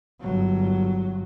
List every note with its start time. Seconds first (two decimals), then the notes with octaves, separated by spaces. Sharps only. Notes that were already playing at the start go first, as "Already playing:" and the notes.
0.21 G1 F#3